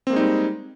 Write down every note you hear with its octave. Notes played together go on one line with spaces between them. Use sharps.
G3 G#3 A#3 C4 D#4